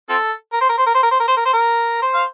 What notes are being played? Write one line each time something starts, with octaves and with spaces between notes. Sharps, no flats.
C4 F4 A4
A#4
C5
A#4
C5
A#4
C5
A#4
C5
A#4
C5
A#4
C5
A#4
C5
F5